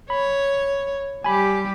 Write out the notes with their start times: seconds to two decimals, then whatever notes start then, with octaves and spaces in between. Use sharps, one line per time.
0.10 C#5 B5
1.24 G3 G4 G#5 B5